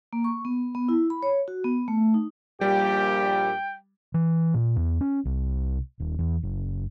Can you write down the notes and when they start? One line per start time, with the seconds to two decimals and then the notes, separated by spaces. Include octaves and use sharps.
0.13 A#3
0.24 C#6
0.45 B3
0.75 B3
0.89 E4
1.10 B5
1.23 C#5
1.48 F#4
1.64 B3
1.88 A3
2.14 D#4
2.61 A#1 A#2 G3 G4 G5
4.14 E3
4.54 A#2
4.76 E2
5.01 C#4
5.25 C2
6.00 D#1
6.19 E2
6.43 F#1